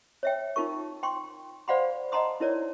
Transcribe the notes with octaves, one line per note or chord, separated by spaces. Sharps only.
C#5 E5 G5
D#4 F4 A#4 C#6
G5 C6 C#6
C5 D5 F5 F#5 B5 C6
D#5 F#5 A5 A#5 C6 D#6
D#4 E4 A#4 C#5 D5